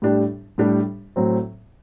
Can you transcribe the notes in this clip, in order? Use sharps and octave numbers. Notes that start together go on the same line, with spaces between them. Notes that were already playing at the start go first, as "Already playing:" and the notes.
A2 G3 D4 G4
A2 G3 D4 G4
A2 F#3 C4